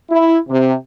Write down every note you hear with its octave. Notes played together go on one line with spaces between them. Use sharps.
E4
C3